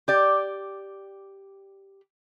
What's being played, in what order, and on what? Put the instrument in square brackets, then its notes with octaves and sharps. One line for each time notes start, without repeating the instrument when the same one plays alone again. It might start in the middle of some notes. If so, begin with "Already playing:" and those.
[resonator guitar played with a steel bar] G4 D5